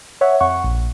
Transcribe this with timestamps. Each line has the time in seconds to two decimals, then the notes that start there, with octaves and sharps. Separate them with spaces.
0.21 C#5 E5 F#5
0.40 F2 F#5 C#6
0.64 A#1